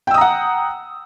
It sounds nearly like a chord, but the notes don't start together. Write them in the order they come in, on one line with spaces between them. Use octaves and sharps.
G5 E6 D#6 A#5 F#5